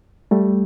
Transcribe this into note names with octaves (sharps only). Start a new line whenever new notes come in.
G3 A3